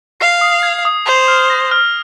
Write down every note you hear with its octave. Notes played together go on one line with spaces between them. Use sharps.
F5 C7
D#6
G#6
D#6
C5 F7
F6
A#6
F6